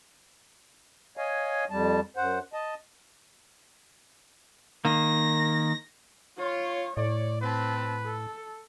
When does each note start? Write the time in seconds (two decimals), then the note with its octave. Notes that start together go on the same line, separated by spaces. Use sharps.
1.17 C#5 D#5 F5 G#5
1.70 F2 G3 A5
2.17 F#2 C5 F#5
2.53 D#5 A5
4.85 D#3 A#3 A#6
6.38 F4 C#5
6.97 A2 C#5 D5
7.42 C4 B4 A5
8.06 A4